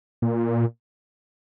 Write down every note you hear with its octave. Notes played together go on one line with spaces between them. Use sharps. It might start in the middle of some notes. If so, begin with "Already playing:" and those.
A#2